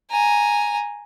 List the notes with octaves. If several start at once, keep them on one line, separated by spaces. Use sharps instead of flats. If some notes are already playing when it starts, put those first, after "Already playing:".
G#5 A#5